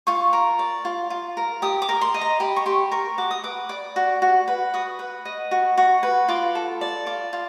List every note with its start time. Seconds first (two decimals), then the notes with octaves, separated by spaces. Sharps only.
0.07 F4 C#6
0.33 A#4
0.59 D5
0.85 F4
1.10 F4
1.37 A#4
1.62 G4 D#6
1.82 D6
1.89 A#4
2.01 C6
2.14 D#5
2.21 A#5
2.40 G4 B5
2.56 C#6
2.66 G4 C6
2.91 A#4 C#6
3.18 F#4 D6
3.31 D#6
3.44 B4 D6
3.69 D5
3.96 F#4
4.22 F#4
4.48 B4
4.74 F#4 D#6
4.99 B4
5.25 D#5
5.51 F#4
5.78 F#4
6.03 B4
6.28 F4 D6
6.55 A4
6.81 D5
7.06 F4 D6
7.33 F4